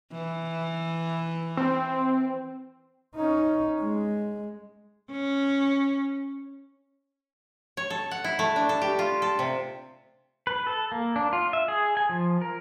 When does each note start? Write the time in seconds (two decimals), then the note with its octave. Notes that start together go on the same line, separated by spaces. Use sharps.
0.12 E3
1.57 C4
3.16 C#4 D#4
3.80 G#3
5.11 C#4
7.77 C#5
7.90 A4
8.11 F#5
8.24 E4
8.39 A3
8.56 D4
8.69 A4
8.82 G4
8.99 F4
9.22 A4
9.39 C3
10.47 B4
10.67 A4
10.92 A#3
11.16 D4
11.33 F4
11.53 E5
11.68 G#4
11.97 G#5
12.09 F3
12.42 A#4